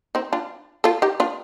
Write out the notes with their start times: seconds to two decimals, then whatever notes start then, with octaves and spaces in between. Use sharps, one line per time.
0.15 C4 D#4
0.33 D4 F4
0.84 F4 A4
1.02 D#4 G4
1.20 D4 F4